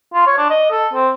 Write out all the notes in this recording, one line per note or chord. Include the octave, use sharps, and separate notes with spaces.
F4
C#5
D4
D#5
A4
C4